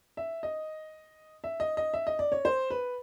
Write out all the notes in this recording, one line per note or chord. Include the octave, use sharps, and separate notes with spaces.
E5
D#5
E5
D#5
D#5
E5
D#5
D5
C#5
C5
B4